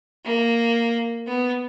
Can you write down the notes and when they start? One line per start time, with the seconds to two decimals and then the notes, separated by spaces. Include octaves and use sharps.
0.25 A#3
1.27 B3